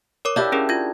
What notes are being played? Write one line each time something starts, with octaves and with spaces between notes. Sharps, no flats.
A#4 C#5 D6
D4 E4 G4 D5 F5 G6
C#4 G#4 A#4
F4 G#6